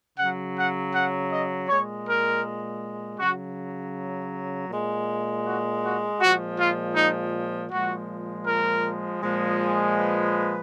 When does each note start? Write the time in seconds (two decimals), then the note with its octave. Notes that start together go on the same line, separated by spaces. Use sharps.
0.18 C#3 F#3 F#5
0.56 F#5
0.94 F#5
1.31 D#5
1.68 A#2 G#3 C#5
2.07 A#4
3.19 C#3 F#3 F#4
4.70 A#2 G#3
5.45 F#4
5.83 F#4
6.20 A#2 F3 G#3 F#4
6.58 F4
6.96 D#4
7.71 A#2 F3 G#3 F#4
8.46 A#4
9.21 A#2 F3 G#3
9.97 B4